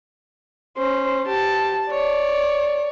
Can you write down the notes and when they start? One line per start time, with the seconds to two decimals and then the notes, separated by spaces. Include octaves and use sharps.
0.78 C#4 C5
1.27 G4 A5
1.91 C#5 D5